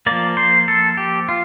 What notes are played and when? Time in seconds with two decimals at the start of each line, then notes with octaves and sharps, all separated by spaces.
0.06 F3 A#3 D5
0.37 C5
0.68 A4
0.97 G4
1.29 F4